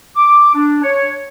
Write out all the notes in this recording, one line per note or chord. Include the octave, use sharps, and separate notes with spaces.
D6
D4
C#5